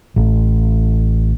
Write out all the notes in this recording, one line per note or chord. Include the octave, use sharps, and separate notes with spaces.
A1